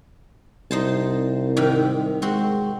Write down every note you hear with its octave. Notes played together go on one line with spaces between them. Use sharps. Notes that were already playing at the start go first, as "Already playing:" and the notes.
C2 D#4 C5 A5
G#2 C3 D#3
G#3 C4 F#4 C6